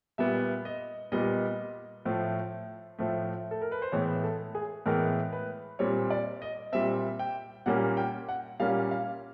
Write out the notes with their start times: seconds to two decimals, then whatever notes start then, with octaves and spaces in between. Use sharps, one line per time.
0.18 A#2 G3 B3 E5
0.65 D#5
1.12 A#2 G3 B3 D#5
2.05 A2 F3 A3
2.99 A2 F3 A3
3.51 A4
3.62 A#4
3.72 B4
3.82 C5
3.92 A2 E3 G#3 B3 C#5
4.23 A4
4.55 G#4
4.86 A2 E3 G#3 B3 A#4
5.33 B4
5.79 A#2 G3 C4 C#5
6.10 D5
6.42 D#5
6.72 A#2 G3 C4 E5
7.19 G5
7.66 A#2 G3 A#3 C#4 F#5
7.97 G5
8.29 F#5
8.60 A#2 G3 A#3 C#4 F5
8.91 F5